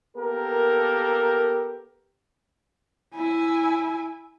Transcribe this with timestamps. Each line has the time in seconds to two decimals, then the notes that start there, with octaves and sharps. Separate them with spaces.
0.17 A#3 B3 G4 A4 A#4
3.15 E4 G#5